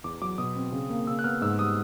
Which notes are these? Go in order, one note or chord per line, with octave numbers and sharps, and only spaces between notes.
E2 D6
F#3 D6
B2 D#6
C4
C#3
A#3
C#3 E6
F#6
B3 F6
G#2 E6
G3 D#6